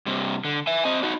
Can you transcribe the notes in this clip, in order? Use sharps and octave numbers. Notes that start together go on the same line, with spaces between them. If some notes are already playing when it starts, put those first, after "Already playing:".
G2 C3
D3
E5 G#5
C4 D#5
D#4 F#4